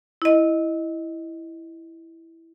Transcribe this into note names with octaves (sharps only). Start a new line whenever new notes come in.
E4 D#5